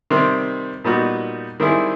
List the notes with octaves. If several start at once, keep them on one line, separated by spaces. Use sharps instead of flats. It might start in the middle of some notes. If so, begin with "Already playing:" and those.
C3 D#3 G3 C4
A#2 G3 B3 D#4 F#4
D#3 G3 C4 E4 G#4